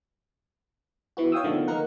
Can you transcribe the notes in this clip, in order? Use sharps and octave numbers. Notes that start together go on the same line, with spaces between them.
E3 B3 F#4
C#5 F5 G5 D#6 E6
D3 D#3 F3 A3 B3
A#3 D#4 A#4 F#5